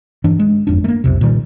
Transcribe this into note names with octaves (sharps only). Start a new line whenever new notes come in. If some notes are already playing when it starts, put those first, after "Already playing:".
G2 E3 D4
G#3
G1 F2 D4
A3 A#3
B1 F2 C3
A#2 D#3 G3